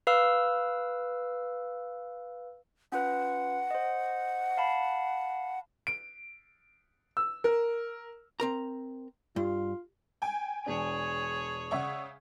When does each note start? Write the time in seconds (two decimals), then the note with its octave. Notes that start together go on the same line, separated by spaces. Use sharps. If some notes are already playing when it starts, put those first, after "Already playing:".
0.07 B4 F5 E6
2.92 C#4 F4 B4 F#5
3.71 C5 D#5
4.57 F5 A5 B5
5.87 D7
7.17 E6
7.44 A#4
8.40 C4 A#4 A#5
9.36 G2 F4
10.22 G5 G#5
10.66 E1 D4 G#4 C#5
11.71 C#3 D5 E5 F#5 C#6